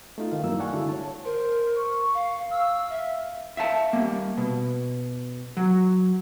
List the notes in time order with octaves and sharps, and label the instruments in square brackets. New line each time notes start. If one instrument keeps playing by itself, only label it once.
[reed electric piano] A3 D#4 F4
D#3 F5
G2 F#3 G3 A#3 E4 E6
D5 F5 F#5 G#5 A5 C#6
D3 G#3 E4 F#4 E5
C#5 A5
[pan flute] A#4 [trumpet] C5
[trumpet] C#6
[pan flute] F5
[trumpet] F5 [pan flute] E6
[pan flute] E5
[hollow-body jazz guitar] E5 F5 A5
G3 A#3
B2
F#3